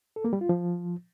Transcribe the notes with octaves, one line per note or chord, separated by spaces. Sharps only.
A4
A#3
G3
F4
F3